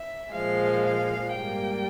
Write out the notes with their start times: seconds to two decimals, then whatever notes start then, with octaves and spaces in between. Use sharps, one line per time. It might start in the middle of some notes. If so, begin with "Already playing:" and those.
Already playing: E5
0.33 A#2 F3 G#3 F5
0.86 F5
1.37 G#2 G3 A#3 G5